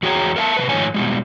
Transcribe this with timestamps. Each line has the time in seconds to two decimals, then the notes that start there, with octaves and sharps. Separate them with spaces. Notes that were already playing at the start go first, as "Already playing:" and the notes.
0.03 E2 F#4 G#4 C#5 G5 A#5
0.36 A4 A#4 E5 F#5 A5
0.57 C3 F3 B4
0.69 G#2 D#3 F3 A3 C#5 G#5
0.94 B2 G3 G#3